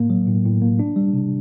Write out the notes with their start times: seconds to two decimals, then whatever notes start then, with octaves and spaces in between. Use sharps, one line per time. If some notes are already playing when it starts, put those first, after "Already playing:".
Already playing: A2 A#3
0.10 F#3
0.28 A2
0.45 A2
0.62 A#3
0.79 D4
0.96 G3
1.13 C3